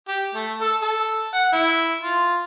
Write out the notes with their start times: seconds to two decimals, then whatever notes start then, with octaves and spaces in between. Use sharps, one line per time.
0.08 G4
0.35 A3
0.61 A4
0.82 A4
1.34 F#5
1.53 E4
2.02 F4